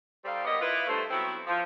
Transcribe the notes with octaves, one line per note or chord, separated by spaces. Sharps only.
G3 D#4 G4 A4 C5 F5
D#2 G3 B3 G4 D#5
E4 F4 B4
G2 A3 C5
F#3 B3 C4 E4
F3